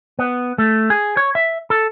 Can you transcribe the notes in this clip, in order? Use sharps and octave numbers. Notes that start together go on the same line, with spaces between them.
B3
A3
G#4
C#5
E5
A4